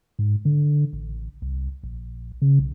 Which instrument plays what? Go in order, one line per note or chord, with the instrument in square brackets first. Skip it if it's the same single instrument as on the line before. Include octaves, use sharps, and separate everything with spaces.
[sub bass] G#2
D3
A1
C2
A#1
C#3
B1